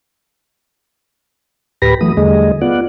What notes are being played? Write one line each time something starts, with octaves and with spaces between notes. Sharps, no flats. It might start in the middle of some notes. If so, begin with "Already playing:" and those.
D2 A2 G4 B4 B5 A#6
E3 F#3 A3 D#6
E2 D3 G3 A3 G#4 D#5
B3 F4 D5 F#5